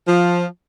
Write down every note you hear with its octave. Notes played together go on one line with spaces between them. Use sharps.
F3